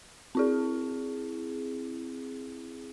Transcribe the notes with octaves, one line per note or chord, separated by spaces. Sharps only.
C4 E4 G#4